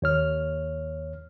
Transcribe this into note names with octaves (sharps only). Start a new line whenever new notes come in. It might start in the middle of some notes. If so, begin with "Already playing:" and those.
D#2 C#5 F6